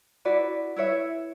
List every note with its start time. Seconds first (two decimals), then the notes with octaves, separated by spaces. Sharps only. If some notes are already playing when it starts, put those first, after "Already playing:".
0.25 E4 F#4 B4 D5
0.76 E4 B4 C#5 E5